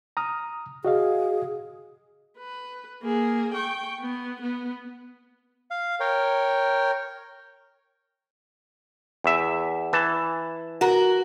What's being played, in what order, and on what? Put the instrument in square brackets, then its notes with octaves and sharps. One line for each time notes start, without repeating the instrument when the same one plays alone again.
[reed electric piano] A#5 D#6 F6
[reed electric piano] F#4 D#5 F5 [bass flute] G#4
[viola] B4
A#3 G#4
G5 C#6
B3
B3
[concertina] F5
A#4 C#5 G5
[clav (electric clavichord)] E2 E5
E3 A5
[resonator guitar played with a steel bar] F#4 A#4